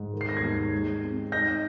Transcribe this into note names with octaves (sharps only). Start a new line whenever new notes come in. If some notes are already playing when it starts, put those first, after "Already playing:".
Already playing: G#2
D#3
C7
A#6
G#6 C7
D#2
G#3
C4
D#4 G6 A#6